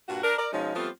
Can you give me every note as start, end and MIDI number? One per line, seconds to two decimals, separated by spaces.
0.09 0.23 43
0.09 0.23 46
0.09 0.23 65
0.09 0.23 66
0.23 0.37 62
0.23 0.37 70
0.38 0.48 70
0.38 0.48 74
0.53 0.75 47
0.53 0.75 53
0.53 0.75 56
0.53 0.75 61
0.53 0.75 63
0.75 0.89 53
0.75 0.89 55
0.75 0.89 57
0.75 0.89 59
0.75 0.89 60
0.75 0.89 65